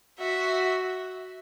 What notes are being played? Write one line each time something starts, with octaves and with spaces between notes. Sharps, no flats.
F#4 E5